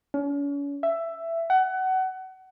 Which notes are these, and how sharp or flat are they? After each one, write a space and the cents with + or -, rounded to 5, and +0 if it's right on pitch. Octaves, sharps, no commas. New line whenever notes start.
C#4 +40
E5 +10
F#5 +25